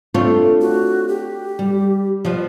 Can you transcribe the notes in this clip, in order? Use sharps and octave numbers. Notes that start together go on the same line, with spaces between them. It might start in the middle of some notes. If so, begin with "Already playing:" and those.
A3 C4 D4 F4 C#5
F#4
G4
G3
F3 G3 B3 C5